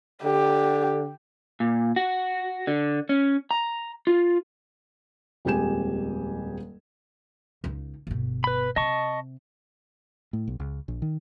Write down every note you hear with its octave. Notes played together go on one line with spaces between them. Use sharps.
D3 G4
A#2
F#4
D3
C#4
A#5
F4
D#1 F2 G#3 G4 G#5 E7
C#2 D#4
G1 B2
B4 B5
C3 D#5 A5 C#6
A2
B1
C#2
A#1
D#3